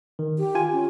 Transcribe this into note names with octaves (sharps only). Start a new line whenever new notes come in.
D#3
G4
F4 G#5
C#4